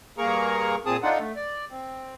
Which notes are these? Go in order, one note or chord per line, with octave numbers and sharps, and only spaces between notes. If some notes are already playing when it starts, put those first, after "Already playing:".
G2 A#3 G#4 A#4 A#5 C#6
A#2 C4 G#4 A5 D#6
D4 D#4 F4 A4 F#5
A3
D5
C4